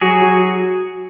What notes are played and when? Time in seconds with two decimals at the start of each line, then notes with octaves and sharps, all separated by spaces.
0.01 F#3 F#4 G#4
0.22 F#3